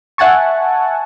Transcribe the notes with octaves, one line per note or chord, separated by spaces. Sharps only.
E5 F#5 G#5 A5 C#6